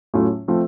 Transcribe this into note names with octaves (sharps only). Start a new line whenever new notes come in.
A2 F#3 A3 C#4 F4
F3 A3 C4 F4